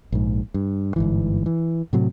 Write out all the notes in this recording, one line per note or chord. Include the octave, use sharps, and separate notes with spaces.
A#1 G#2
G2
G1 G#2 E3
E3
A2 C3 F#3